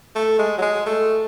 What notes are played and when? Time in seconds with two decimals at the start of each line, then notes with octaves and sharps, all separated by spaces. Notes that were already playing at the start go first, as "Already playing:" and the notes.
0.15 A3
0.39 G#3
0.58 F#3
0.62 G#3
0.86 A3